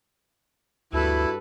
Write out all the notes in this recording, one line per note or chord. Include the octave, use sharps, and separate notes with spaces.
D2 G2 E4 F#4 A4 B4